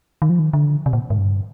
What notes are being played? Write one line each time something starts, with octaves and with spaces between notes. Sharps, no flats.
D#3
F3
D#3
D3
C3
A#2
G#2
G2